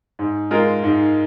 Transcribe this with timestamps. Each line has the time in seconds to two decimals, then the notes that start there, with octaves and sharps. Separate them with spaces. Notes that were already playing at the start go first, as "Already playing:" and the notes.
0.19 G#2
0.51 G#3 F4 A#4
0.83 G#2